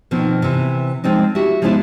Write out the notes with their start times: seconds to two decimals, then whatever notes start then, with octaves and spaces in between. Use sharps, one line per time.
0.11 B2 D#3 F3 A#3 C4
0.42 C3 E3
1.04 F3 G#3 C4 D#4
1.35 E4 F#4 G4 E5
1.62 F3 G#3 B3 D4 E4 F4